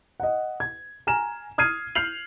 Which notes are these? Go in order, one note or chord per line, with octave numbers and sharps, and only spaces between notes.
D#5 F#5
G#6
G#5 A#5 F6 E7
D#6 F6 G#6 C7 D#7
F6 G6 C7 F7 F#7